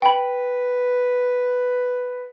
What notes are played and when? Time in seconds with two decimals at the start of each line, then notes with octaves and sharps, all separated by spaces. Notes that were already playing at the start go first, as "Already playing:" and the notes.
0.02 B4 G5 B5